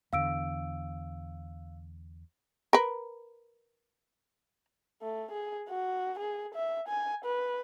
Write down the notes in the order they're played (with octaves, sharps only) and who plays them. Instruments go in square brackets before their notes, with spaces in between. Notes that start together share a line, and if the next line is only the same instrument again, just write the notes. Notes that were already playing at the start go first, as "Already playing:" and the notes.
[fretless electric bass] E2 D3 [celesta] F5 E6 D7
[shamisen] A#4 B4
[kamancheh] A3
G#4
F#4
G#4
E5
G#5
B4